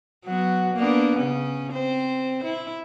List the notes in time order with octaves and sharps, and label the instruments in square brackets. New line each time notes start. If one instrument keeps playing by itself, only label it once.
[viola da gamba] F#3 B3 F#4
A#3 B3 D4
C#3 C#4
C4 C5
E4